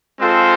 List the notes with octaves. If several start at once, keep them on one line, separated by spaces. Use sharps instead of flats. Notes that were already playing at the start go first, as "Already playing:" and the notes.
G#3 C4 F4 A4 C5